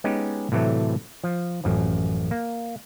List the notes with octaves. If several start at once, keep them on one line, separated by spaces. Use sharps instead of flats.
G#3 B3 C#4 D#4 G4
A2 C3 E3 F#3 A3
F3
A1 F#2 F3
A#3